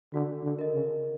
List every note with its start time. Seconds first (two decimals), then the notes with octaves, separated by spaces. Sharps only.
0.14 D3 F#4
0.44 D3
0.59 A#4 D#5
0.73 C#3